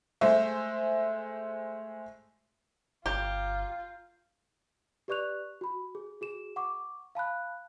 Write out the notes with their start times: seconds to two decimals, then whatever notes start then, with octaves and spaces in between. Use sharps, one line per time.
0.21 G#3 A3 C5 E5
3.06 G1 F4 G4 G5 A#5 G6
5.08 G4 B4 D5 C#6 F#6 F7
5.61 F#4 B5
5.95 G#4
6.21 F#4 G#4 E7
6.56 F#5 C#6 D6
7.15 F5 A5 B5 F#6